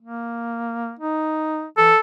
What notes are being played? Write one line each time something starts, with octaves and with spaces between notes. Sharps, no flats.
A#3
D#4
E3 A4